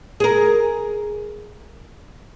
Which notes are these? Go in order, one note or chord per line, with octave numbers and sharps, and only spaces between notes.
G#4 A#4